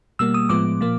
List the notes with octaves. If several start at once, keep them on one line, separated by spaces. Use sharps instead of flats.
B2 G3 A#3 E6
D#6
A2 F3 G#3 B3 D6
A#2 F3 A#3